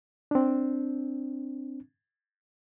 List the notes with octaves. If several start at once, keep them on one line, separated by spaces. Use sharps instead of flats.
C4 D4